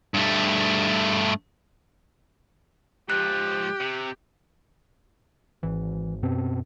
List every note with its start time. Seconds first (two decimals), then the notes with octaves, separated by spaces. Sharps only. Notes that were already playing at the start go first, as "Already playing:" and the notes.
0.14 G2 A3
3.10 G#2 F3 G4 F#6
3.81 C3
5.63 G#1 E3
6.23 F#2 B2 C4